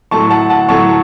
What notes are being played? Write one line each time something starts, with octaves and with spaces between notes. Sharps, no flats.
A2 F#3 A3 A5 C#6
F#5 A5
F#5 A5
A2 F#3 A3 A5 C#6